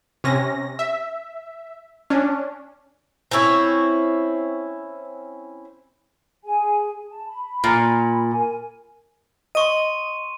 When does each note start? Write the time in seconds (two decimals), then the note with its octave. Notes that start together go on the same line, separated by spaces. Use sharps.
0.24 C3 C#4 A#6
0.79 E5
2.10 C#4 D4
3.31 C4 C#4 E4 C#5
6.43 G#4 G#5
7.09 A5
7.28 B5
7.64 A#2
8.31 A#4 G#5
9.55 D#5 C6 C#6 D#7